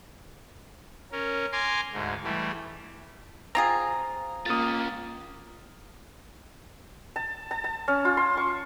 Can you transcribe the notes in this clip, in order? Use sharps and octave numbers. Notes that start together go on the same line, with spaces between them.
C#4 A#4
G#5 A#5 C6 D6
D2 G#2
E3 G3 A3
C4 F4 G#4 A#5
A#3 C#4 F4 D#6 A6
A5
A5
A5
C#4
F4
C6
C#6